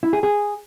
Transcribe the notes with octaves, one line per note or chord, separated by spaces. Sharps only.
E4
G#4
G#4